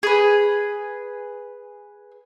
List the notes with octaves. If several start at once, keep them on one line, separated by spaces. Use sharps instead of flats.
G#4 B4